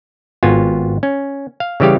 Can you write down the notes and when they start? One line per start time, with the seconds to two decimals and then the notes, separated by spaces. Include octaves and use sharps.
0.43 G#1 B3 F4 F#4 G#5
1.03 C#4
1.60 F5
1.80 C#3 E3 G3 G4 F5